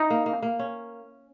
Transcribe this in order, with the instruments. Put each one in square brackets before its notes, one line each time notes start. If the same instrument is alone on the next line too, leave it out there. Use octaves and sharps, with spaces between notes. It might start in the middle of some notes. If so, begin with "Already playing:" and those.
Already playing: [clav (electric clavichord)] D#4 [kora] E4
[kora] A#3
A#3
A#3
C#4